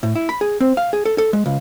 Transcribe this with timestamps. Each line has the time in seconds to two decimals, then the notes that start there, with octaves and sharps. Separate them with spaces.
0.03 A2
0.15 E4
0.29 B5
0.41 G#4
0.60 C4
0.77 F5
0.93 G#4
1.05 A4
1.18 A4
1.33 G#3
1.46 C#2